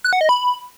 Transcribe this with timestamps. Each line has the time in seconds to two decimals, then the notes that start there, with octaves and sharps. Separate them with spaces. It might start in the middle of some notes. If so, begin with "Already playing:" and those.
0.04 F#6
0.13 F#5
0.21 D#5
0.29 B5